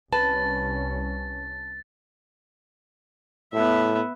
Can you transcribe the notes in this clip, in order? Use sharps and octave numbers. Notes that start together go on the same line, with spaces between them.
C2 C#4 B4 A5 A6
A2 B3 E5